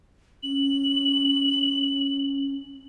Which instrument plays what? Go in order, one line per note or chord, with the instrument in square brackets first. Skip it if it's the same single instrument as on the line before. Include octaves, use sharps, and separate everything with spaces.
[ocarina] C#4 [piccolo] F#7